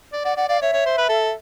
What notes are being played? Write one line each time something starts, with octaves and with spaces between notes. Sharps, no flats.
D5
D5 F#5
D5 F#5
D5 F5
C#5 E5
C#5
C5
B4
A4